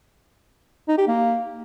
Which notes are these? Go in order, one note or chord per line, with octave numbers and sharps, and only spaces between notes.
D#4
G4
A#3